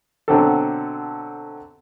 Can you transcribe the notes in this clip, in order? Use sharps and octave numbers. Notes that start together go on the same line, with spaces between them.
B2 D3 F#3 C4 G4 A4